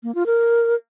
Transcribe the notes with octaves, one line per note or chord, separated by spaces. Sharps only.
A#3
F4
A#4